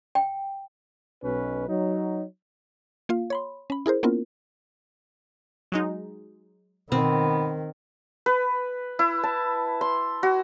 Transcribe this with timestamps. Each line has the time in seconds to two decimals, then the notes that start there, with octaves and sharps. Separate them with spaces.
0.15 G5
1.23 B1 B2 C#4 B4
1.69 F#3 D#4
3.09 A#3 F4 F5
3.30 C#5 B5 C6
3.70 C#4 B5
3.86 E4 G#4 A#4 C5
4.03 A#3 B3 C#4 E4 F4 A#4
5.72 F#3 G#3 D#4
6.92 B2 D#3 B3 C4
8.26 B4
8.99 E4
9.23 A5
9.81 C6
10.23 F#4